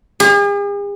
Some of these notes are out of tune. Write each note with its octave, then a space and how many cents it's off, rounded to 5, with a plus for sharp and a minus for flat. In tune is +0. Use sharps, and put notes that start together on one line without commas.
G#4 -45